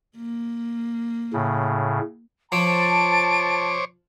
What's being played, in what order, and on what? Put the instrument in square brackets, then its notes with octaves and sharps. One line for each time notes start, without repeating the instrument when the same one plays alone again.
[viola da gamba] A#3
[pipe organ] A2 C#3
[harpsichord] F3 [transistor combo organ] C5 C#5 D6 [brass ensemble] A5 [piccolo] D7